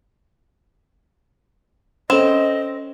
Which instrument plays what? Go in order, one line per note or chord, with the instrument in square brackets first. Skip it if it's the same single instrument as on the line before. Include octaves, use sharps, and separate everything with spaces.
[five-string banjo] C4 [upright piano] C#4 [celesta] A4 E7 [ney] D#5